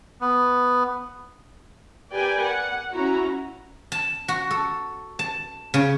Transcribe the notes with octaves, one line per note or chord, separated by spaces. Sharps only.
B3
G4 A#4 B4 D5 G5 G#5
F#5
C#4 E4 F#4 A#5
A5
F#4
A4
A5
C#3